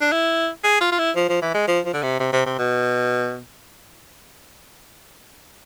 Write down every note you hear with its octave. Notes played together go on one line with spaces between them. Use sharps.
D4
E4
G#4
F4
F4
E4
F3
F3
E3
G#3
F3
F3
D3
C3
C3
C3
C3
B2